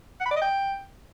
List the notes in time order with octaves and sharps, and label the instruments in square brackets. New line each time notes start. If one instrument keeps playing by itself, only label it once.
[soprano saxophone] F#5
B5
D5
D#5
G5